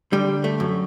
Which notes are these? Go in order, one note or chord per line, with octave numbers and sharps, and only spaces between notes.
D3 G3
A3
F#2